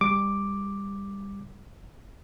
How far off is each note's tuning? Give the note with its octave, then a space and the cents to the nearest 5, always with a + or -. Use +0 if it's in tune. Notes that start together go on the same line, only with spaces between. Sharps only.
G3 +25 D6 +0